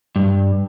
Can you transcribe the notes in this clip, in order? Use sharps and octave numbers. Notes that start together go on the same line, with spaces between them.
G2